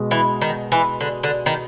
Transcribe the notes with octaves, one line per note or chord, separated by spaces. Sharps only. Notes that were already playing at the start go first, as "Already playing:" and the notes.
Already playing: B2 G#3
E3
D#3
E3
D3
D3
D#3